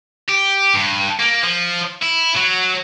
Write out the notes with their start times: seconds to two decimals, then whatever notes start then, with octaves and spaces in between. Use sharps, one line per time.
0.29 G4
0.74 G2
1.19 A#3
1.43 F3
2.02 E4
2.36 F#3